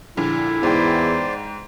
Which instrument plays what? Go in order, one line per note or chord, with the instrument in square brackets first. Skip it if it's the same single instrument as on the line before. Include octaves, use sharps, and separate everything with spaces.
[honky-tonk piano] A#1 A#2 D3 [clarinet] E4
[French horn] E2 [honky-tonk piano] G#2 G5 [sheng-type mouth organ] C5 D5